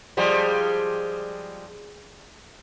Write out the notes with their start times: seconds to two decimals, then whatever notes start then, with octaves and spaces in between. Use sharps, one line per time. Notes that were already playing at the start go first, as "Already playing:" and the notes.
0.17 F3 G3 G#3